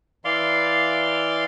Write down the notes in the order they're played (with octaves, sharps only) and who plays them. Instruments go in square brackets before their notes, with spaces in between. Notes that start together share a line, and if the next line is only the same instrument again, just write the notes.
[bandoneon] E3 D5 F5 C6